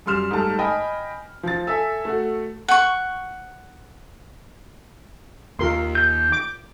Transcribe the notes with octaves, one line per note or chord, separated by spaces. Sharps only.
F#2 G3 C6 F6 E7
G#2 G3 A3 A5
D#5 G5 G#5 B5
F3 A6
A4 E5 G#5 E6
A3 F#4
F#5 C#6
D#2 F4 A#4 C6
G6
D6